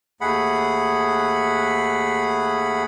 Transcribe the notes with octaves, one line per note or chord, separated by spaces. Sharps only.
D#2 A3 G#4 F#5 B5